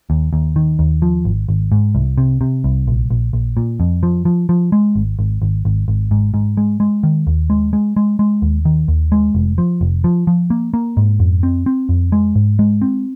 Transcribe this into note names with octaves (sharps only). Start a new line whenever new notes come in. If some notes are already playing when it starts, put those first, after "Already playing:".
D#2
D#2
D#3
D#2
F3
G#1
G#1
G#2
C2
C3
C3
C2
A#1
A#1
A#1
A#2
F2
F3
F3
F3
G#3
G#1
G#1
G#1
G#1
G#1
G#2
G#2
G#3
G#3
D#3
D#2
G#3
G#3
G#3
G#3
D#2
D#3
D#2
G#3
F1
F3
F1
F3
F3
A#3
A#3
G#2
F2
C4
C4
F2
G#3
G#2
G#3
C4